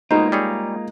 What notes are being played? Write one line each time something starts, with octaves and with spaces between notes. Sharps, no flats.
B2 G#3 A#3 D#4 F4 C5
G3 G#4 C#5